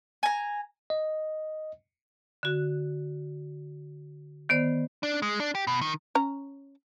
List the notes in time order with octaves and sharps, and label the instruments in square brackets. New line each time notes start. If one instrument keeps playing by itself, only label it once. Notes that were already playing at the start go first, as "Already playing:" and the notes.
[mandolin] G#5 A#5
[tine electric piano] D#5
[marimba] D3 F#4
D#3 B3 C5 D5
[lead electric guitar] D4
G#3
D4
G4
B2
D#3
[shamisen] C#4 A#5